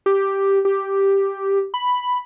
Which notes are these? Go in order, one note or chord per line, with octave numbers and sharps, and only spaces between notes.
G4
G4
B5